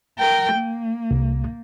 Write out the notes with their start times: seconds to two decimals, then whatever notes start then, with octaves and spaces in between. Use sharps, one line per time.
0.19 A#4 G5
0.54 A#3
1.11 C2